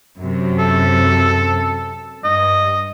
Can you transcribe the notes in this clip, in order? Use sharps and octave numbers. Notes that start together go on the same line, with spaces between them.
F#2 C3
A4
G2 D#5